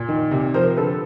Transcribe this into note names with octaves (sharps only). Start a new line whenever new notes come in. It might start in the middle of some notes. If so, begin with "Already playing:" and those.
Already playing: A#2
D#3
C3
F3 A#4 C5
D3 A4 B4